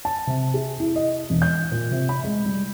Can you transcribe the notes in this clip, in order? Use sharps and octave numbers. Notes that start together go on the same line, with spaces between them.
A5
C3
G#4
E4
D#5
E1
G6
A#2
C3
B5
G#3
G3